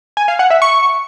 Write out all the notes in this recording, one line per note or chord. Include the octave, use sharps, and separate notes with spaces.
G#5
F5
F#5
E5
C#6